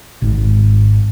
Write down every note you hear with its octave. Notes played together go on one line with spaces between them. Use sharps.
G#1 G#2